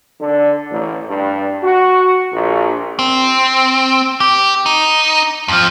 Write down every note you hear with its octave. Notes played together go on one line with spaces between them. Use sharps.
D3
A1
G2
F#4
A#1
C4
G4
D#4
F2 F3